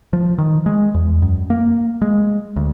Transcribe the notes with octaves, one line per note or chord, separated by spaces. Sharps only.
F3
D#3
G#3
E2
F#2
A#3
G#3
D2